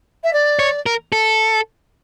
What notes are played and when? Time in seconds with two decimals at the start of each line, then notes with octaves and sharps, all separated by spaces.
0.24 E5
0.33 D5
0.59 C#5
0.86 A#4
1.12 A4